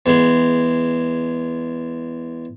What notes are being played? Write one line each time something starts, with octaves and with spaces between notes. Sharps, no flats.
E2 G#3